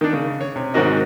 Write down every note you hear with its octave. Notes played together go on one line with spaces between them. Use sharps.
D#3 D4
C#3
C#5
C3
G#2 D#3 C4 F#4 A#4 D#5